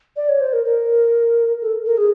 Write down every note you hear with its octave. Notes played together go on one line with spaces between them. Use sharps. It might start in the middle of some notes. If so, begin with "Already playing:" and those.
D5
C#5
C5
A#4
A#4
A4
A#4
G#4